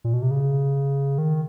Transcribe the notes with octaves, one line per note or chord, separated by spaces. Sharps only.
A#2
B2
C3
C#3
D#3